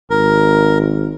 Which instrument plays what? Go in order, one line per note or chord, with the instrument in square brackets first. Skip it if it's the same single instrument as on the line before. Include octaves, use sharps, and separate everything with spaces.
[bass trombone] G#1 [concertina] A#4